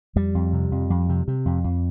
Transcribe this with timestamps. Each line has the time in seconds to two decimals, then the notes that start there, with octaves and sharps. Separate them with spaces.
0.16 F2 G3
0.35 F2
0.53 C3
0.72 F2
0.90 F2
1.09 C3
1.28 C3
1.46 F2
1.64 F2